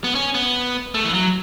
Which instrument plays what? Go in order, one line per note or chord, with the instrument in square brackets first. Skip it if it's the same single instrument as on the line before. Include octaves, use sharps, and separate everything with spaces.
[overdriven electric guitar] B3
C#4
B3
A3
E3
F#3